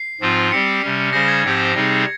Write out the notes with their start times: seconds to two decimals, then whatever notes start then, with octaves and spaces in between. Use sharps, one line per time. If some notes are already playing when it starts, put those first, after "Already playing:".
Already playing: C7
0.20 G#2 F3 C4 F4
0.52 G3 C4 G4 C#7
0.82 C3 G3 C#4
1.13 C#3 G3 C#4 G#4 C5 A#6
1.28 G#6
1.43 G#2 F3 C4 G4 C5
1.75 C3 G3 C4 D#4 G#4